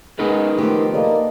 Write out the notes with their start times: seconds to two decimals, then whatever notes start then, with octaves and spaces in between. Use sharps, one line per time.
0.19 G#3 B3 D#4 A#4 B4
0.58 D#3 F3 A3 G4
0.94 A#3 A4 D5 D#5